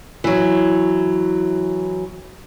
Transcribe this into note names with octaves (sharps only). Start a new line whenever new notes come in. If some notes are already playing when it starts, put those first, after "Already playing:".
E3 F#3